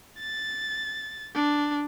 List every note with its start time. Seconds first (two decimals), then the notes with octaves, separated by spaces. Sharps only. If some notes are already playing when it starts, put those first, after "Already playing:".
0.19 A6
1.35 D4